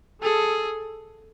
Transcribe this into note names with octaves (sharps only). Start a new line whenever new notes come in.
G#4 A4